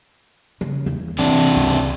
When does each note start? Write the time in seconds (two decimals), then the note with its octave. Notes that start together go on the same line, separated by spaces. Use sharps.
0.61 C#3
0.86 E2
1.19 C3 E3 D4
1.56 C#2